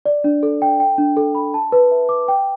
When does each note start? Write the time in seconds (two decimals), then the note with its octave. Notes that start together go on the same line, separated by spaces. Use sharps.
0.06 D5
0.24 D4
0.43 A4
0.62 G5
0.80 G5
0.98 D4
1.17 A4
1.35 B5
1.54 A5
1.72 B4
1.91 E5
2.09 D6
2.28 G5